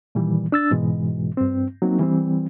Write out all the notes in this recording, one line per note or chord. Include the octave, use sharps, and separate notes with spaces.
A#2 D#3 E3 G3
D4 E6 A6
G#2 B2 E3 G#3
G2 C4
F#3 A#3 C4 D#4
E3 G3 C4